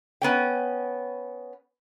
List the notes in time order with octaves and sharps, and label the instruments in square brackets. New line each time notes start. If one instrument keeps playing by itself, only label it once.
[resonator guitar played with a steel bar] B3 C#4 G5